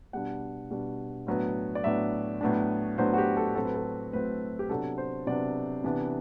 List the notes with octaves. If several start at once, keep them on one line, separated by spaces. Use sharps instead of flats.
B2 G3 D4 F#5
B2 G3 D4
A2 F#3 B3 D4
D5
A2 F#3 B3 D4 E5
A2 F#3 B3 D4
A2 F#3 B3 D4 C5
F#4
G4
A4
A2 F#3 C4 A4
B4
A4
A2 F#3 C4 B4
G4
C3 F#3 B3 D4 A4
C5
C3 F#3 B3 D4 D5
C3 E3 B3 D4